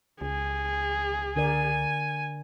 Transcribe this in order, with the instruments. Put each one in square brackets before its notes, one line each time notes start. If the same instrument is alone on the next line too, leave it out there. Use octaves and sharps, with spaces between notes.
[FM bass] C#2 [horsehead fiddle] G#4
[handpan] D3 A#4 D5 [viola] G#5